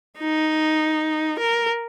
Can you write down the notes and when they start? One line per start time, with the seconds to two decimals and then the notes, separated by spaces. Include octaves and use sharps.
0.18 D#4
1.39 A#4